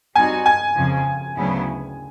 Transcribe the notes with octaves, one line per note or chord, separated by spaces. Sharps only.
G3 C4 D#4 F#4 G#5
G#5
F2 C#3 F3
D2 C#3 F#3 B3 E4